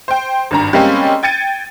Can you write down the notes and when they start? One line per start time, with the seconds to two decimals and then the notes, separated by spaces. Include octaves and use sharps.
0.08 C5 G5
0.51 G#1 G2 A#5
0.73 G3 G#3 A#3 C4 C#4
1.23 G5 G#6 A6 C#7 D#7